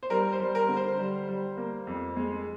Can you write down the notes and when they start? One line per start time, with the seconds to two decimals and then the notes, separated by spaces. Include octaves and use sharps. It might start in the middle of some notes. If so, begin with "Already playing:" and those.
0.03 C5
0.10 G3 A#4
0.32 C5
0.40 G3
0.55 A#4
0.69 D3
0.77 C5
0.99 G3
1.29 G3
1.57 A#3
1.87 F2
2.17 G#3